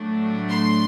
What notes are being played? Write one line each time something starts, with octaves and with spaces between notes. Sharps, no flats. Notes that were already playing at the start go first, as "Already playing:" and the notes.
Already playing: A2 F#3 A3 D4
C6